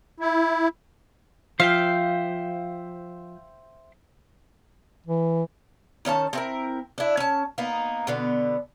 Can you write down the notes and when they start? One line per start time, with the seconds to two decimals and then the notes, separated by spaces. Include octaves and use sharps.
0.20 E4
1.60 F3 C5 E5 F5 G5
5.06 E3
6.05 D#3 C#4 D#5 A5
6.33 C4 E4 A#4
6.98 D4 E4
7.17 C#4 A5
7.58 A#3 B3 D#4
8.07 B2 D3 B3